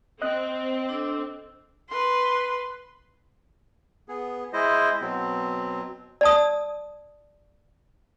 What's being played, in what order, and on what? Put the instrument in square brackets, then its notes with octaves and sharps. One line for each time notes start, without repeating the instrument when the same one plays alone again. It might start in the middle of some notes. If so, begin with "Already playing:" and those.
[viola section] C4 [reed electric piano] D#5 F#6
[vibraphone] D4 A4 E6
[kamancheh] B4 C6
[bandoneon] B3 G#4
G#3 E4 C5 D#5
B2 F#3 C4
[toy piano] D5 A5 D#6